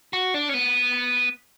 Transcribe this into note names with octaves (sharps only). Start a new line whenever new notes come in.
F#4
D4
C#4
B3